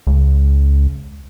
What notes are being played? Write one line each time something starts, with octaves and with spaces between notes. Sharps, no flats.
C#2